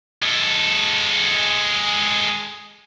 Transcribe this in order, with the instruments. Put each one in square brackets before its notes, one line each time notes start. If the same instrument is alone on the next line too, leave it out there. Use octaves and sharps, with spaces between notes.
[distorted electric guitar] G#3 A4